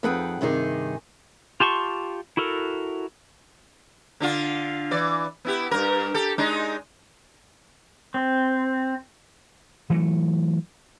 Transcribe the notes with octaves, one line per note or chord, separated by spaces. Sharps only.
F2 D#4 G#4 B4 F#5 G5
G2 C3 D#3 D#4 G#4
F4 G4 A5 C6 C#6
E4 F#4 A4 A#4
D3 D4 F4
E3 D5
B3 E4 G4
G2 A#4
G4 A4
G#3 D4 D#4
C4
E3 F#3 A3